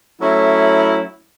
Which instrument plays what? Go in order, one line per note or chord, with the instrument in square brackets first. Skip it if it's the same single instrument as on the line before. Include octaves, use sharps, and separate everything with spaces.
[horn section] F#3 A3 C#4 E4